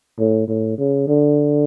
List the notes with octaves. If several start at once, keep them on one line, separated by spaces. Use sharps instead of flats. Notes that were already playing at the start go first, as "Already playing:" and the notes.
A2
A2
C#3
D3